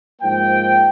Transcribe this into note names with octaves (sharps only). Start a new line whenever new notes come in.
G#2 F3 A#3 G5